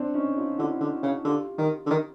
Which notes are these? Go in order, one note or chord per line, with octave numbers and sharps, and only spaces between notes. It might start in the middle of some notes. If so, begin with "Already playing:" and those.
Already playing: C4 D4
C#4 D#4
D#4 F4
D3 E4 F#4
D3
C#3
D3 F4 G4
D#3
D3
D#3